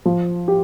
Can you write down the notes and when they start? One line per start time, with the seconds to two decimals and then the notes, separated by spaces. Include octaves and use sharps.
0.05 F3
0.48 G4